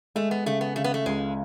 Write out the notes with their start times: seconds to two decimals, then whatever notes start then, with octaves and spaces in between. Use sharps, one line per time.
0.15 G#3 A3
0.31 B3
0.46 C#3 A3
0.61 B3
0.76 C#3 A3
0.84 B3
0.94 A3
1.06 C#2 G#3